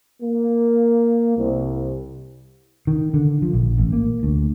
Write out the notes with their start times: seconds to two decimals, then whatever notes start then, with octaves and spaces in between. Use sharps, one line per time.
0.23 A#3
1.37 C2
2.87 D#3
3.14 D3
3.42 F3
3.53 A#1
3.78 A1
3.93 A#3
4.23 D2